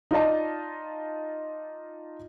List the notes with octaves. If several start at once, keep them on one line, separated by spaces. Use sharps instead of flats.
D#4 F4 D5 D#5 A5